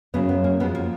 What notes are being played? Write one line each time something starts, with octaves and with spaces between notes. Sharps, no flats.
F#2 C#3 F#3 B3
B3
A#3
F2 F3 G#3 B3
A#3